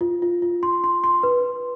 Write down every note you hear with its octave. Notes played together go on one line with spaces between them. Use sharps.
F4
F4
F4
C6
C6
C6
B4